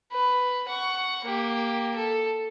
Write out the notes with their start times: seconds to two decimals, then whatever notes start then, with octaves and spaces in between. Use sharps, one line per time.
0.12 B4
0.68 F#5 C#6
1.25 A#3 G4
1.95 A4